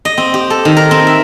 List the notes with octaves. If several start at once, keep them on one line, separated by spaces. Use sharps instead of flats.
D#5
C4
G4
A4
D#3
A#4
C4
E5